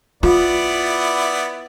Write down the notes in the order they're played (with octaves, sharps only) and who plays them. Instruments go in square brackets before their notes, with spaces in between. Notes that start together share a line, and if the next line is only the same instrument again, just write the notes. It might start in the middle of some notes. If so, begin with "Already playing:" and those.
[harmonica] B3 E4 D5 [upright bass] F4